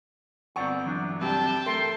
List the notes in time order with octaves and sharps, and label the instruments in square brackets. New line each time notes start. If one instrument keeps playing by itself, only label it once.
[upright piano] G1 C#6 [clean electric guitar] C4 D5 F#5
[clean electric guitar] E3 F#3 D4
[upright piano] G2 C3 [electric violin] G5 A5
[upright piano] A3 [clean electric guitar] A#4 [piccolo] C6